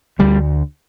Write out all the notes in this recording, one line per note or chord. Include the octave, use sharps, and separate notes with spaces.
D2 D3 G3